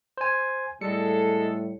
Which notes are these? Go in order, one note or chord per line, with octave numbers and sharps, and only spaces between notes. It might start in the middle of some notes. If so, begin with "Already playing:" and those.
C5 G#5
A2 G3 G#3 A4 C#7